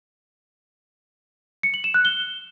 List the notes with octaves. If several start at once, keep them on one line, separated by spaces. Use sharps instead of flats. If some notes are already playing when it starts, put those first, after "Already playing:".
C#7
F#7
E7
F#6
G7